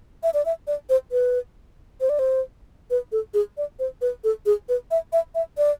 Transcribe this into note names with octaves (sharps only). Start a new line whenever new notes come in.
E5
D5
E5
D5
C5
B4
C5
D5
C5
B4
A4
G#4
D5
C5
B4
A4
G#4
B4
E5
E5
E5
D5